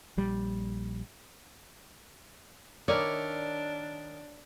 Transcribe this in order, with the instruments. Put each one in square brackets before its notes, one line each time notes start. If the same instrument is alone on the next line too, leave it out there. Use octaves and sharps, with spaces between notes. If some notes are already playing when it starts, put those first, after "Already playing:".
[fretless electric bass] A#1 G3
[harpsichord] D#3 E4 A#4 [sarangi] D4 [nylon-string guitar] C#5 [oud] D5